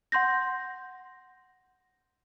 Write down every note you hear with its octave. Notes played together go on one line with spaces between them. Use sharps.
F#5 C6 G6 A#6